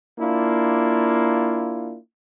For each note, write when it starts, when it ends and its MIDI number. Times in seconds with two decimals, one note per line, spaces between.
0.18 1.96 58
0.18 1.96 62
0.18 1.96 64
0.18 1.96 65